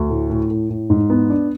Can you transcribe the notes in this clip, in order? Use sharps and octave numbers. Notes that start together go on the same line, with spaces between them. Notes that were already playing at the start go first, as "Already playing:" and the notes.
Already playing: D2
A2
A2
A2
A2
G#2
B3
D4